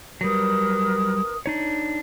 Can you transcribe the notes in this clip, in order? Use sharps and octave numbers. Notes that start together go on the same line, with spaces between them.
F#3 G3 A#4 B4 D#6
D4 D#4 C#5